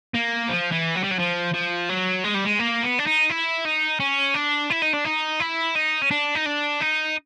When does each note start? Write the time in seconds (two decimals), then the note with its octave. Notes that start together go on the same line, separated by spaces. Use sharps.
0.14 A#3
0.49 F3
0.72 E3
0.96 F#3
1.04 G3
1.11 F#3
1.19 F3
1.54 F3
1.89 F#3
2.24 G#3
2.35 G3
2.45 G#3
2.59 A#3
2.83 B3
2.99 D4
3.06 D#4
3.30 E4
3.65 D#4
4.00 C#4
4.35 D4
4.70 E4
4.82 D#4
4.93 D4
5.05 D#4
5.40 E4
5.76 D#4
6.02 C#4
6.11 D4
6.35 D#4
6.46 D4
6.81 D#4